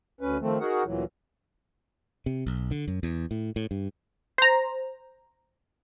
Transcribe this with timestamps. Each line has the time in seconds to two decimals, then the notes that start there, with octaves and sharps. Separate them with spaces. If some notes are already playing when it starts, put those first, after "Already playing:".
0.21 D2 C#4 B4
0.41 D#3 F3 A3 C4
0.60 D#4 F#4 G#4 A#4 F#5
0.84 D2 A#2 E3 F#3
2.26 C3
2.47 B1
2.71 D3
2.88 F#2
3.03 E2
3.31 A2
3.56 A2
3.71 G2
4.38 C5 A#5